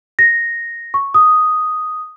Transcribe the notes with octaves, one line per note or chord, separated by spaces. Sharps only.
A#6
C#6
D#6